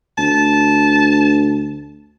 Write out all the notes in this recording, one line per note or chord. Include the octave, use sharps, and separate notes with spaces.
D2 A5